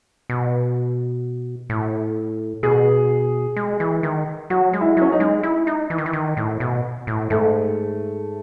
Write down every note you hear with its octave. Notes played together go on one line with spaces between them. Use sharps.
B2
A2
B2 G#4
G#3
E3
D#3
F#3 F#4
G#3
E4
F#3 C#4
D#4
G#3
E4
D#4
E3
D#3
E3
D#3
A2
B2
A2
G#2 A3